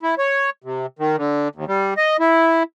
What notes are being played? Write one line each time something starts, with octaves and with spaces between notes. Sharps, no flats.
E4
C#5
C3
D#3
D3
D#2
G3
D#5
E4